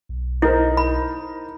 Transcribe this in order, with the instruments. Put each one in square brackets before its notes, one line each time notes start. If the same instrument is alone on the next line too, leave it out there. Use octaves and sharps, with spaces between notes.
[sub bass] B1
[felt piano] D#4 A#4 C5 [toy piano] E4
[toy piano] B5